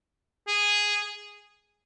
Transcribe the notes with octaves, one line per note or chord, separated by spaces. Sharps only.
G#4